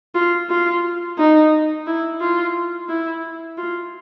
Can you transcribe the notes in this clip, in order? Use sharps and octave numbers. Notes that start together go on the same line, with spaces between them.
F4
F4
D#4
E4
F4
E4
F4